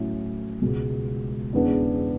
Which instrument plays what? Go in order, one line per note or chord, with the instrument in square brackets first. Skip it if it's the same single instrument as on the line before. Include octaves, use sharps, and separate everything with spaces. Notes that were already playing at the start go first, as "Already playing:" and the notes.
Already playing: [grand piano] A2 F#3 C#4 E4
C#2 B2 G#3
E2 C#3 G#3 B3 D4